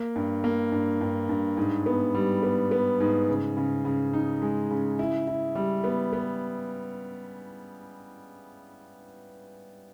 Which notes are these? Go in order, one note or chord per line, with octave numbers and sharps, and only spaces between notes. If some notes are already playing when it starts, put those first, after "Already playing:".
Already playing: A#3
G2
A#3
G2
G2
G2
G#2
B3
G3
B3
B3
G#2
C#3
C#3
C#3
D#4
G#3
C#3
E4
E4
G3
B3
B3